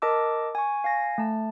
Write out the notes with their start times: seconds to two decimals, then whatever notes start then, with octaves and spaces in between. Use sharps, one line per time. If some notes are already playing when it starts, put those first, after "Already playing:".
0.02 A#4 D#5 A5 D6 E6
0.55 G#5 C#6
0.84 F5 G#5 A#6
1.18 A3 A5